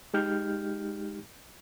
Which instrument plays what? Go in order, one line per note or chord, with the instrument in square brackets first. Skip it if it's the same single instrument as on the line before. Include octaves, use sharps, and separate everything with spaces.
[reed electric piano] G#3 D#4 G4 F6 G6